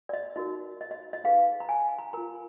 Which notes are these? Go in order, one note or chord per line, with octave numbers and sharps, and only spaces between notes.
D5
D#5
D#4 F#4 A#4 D#5
D#5
D#5
D#5
D#4 G#4 B4 F5
A#5
G#5
A#5
F4 A#4 A#5